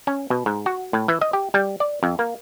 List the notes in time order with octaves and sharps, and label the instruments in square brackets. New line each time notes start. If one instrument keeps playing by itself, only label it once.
[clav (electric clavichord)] C#4
B2
G#2
F#4
A2
E3
D#5
G4
G3
D5
F2
A#3